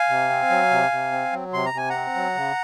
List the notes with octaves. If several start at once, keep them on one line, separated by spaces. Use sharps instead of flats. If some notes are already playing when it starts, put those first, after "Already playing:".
Already playing: F5 G#5
C3
C4
F#3
C3
C3
C4
F#3
C3 C6
A#5
C3 G#5
C4 F#5 A#5
F#3
C#3